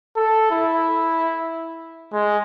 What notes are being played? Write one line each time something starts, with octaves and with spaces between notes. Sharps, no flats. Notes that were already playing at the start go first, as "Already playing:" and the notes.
A4
E4
G#3